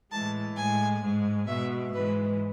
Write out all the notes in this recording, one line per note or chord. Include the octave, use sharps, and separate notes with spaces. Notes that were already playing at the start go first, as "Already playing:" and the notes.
A2 E3 G#3 A5
A2 G#3 G#5
G#2 G#3
B2 G#3 E5
G#2 E3 G#3 B4